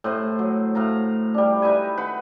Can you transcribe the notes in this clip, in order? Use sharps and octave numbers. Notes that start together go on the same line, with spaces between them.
A2 C5 D#5
F#3
A2 F5 A#5
G3 D4
D#4 B4 E5 G#5
B4 F#5